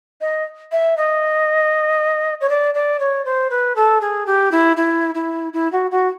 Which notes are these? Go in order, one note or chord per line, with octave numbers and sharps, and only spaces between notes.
D#5
E5
D#5
C#5
D5
D5
C#5
C5
B4
A4
G#4
G4
E4
E4
E4
E4
F#4
F#4